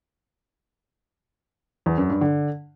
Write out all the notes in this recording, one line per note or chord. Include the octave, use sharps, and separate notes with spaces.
E2
F#2
G2
D3